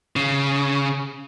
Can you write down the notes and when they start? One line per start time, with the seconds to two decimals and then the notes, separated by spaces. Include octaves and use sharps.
0.16 C#3